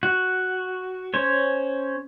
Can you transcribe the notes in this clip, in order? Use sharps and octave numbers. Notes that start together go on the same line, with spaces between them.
F#4
C#4 C5 C#5